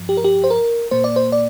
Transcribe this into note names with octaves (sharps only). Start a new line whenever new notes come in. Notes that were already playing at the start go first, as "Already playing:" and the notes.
Already playing: G2 F3
G4
A#4
G4
C5
A#4
A#2 A#3 C5
D5
C5
D5